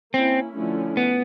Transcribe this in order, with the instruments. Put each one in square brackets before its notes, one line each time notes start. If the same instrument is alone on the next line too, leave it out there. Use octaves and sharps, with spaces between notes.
[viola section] A#3 C#4 E4 [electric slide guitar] C4
[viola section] D3 F3 A3 C#4 E4
[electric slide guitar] B3